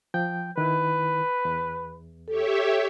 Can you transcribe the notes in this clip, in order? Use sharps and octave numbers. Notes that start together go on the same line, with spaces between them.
F3 G5 G6
D#3 E4 B4
E2
G4 A4 C#5 E5